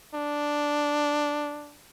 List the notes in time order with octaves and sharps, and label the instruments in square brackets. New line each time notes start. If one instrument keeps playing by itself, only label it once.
[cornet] D4